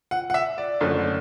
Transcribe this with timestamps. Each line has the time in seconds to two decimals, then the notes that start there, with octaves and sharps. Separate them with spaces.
0.11 F#5
0.30 F#5
0.34 E5
0.58 D5
0.81 F#1 F#2 D3 A3